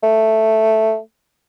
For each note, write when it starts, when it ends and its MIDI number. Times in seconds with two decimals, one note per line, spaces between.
0.03 0.97 57